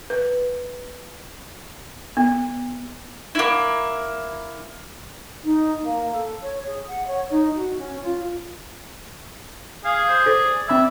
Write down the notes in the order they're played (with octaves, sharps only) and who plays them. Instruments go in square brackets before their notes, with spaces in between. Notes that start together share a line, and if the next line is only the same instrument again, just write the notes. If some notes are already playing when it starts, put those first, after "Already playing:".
[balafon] B4
B3
[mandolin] A#3 E4
[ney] D#4
A#3
A4
C#5
G#4
F#5
C#5
D#4
F#4
C#4
F4
[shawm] G#4 [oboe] F5
[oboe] C5
[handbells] A4 C5 [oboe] D5
[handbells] C4 B5 G#6 [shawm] E5